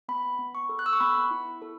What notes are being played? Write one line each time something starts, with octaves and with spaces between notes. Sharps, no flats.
B3 B5
B3
C#6
A4
F#6
E6
C#6
B3 B5
E4
A4